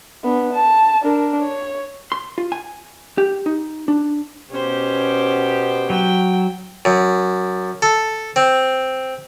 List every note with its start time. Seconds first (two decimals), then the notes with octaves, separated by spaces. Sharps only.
0.24 B3 D4
0.53 A5
1.02 D4 A#4
1.42 C#5
2.12 C6
2.38 F4
2.52 G#5
3.18 G4
3.46 D#4
3.88 D4
4.50 B2 B3 C#4 G4 C5
5.90 F#3 G5
6.85 F#2
7.82 A4
8.36 C4